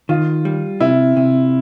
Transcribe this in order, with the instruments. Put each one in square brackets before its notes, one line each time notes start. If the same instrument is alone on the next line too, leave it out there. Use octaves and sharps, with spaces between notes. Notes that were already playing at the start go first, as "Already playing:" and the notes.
[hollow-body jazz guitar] D#3 [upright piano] F4
[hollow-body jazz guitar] G3
[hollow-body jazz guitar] C3 [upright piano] E4
[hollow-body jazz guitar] C3